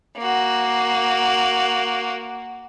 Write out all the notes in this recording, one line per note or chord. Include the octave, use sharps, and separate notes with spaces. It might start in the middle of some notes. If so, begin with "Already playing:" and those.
A#3 F#4